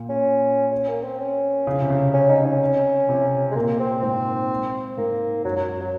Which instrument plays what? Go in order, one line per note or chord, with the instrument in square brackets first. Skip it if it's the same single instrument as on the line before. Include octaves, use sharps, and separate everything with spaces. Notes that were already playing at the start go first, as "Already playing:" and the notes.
Already playing: [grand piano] A#2
[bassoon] C#4
C#4
A#3
C4
C#4
[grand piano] C#3
C3
C#3
[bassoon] C#4
D#4
C#4
[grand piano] C3
[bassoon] G#3
[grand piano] A#2 [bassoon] A#3
[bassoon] C4
[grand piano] G#2 [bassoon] C4
[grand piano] G#2 [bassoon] A#3
[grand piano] F#2 [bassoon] F#3
[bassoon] F#3
F#3